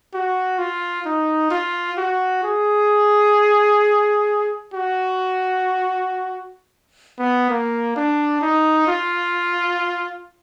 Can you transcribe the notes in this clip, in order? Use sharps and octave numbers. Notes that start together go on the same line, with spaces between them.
F#4
F4
D#4
F4
F#4
G#4
F#4
B3
A#3
D4
D#4
F4